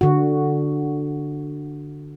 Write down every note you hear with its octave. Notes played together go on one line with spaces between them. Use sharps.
D3 F#4